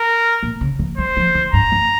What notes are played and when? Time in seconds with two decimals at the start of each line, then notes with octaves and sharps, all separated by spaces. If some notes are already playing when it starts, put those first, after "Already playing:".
Already playing: A#4
0.43 A#2
0.61 C#3
0.79 E3
0.98 G3 C5
1.17 F3
1.35 E3
1.53 G2 A#5
1.72 G2